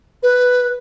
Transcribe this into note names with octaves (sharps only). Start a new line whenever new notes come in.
B4